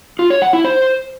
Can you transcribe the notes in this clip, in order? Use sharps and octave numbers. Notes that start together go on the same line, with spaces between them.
F4
C#5
F#5
E4
C5